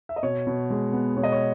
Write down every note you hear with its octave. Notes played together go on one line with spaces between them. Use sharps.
E5
D#5
B2 C#5
B2
G#3
B3
B2 C#5
D#5
C#5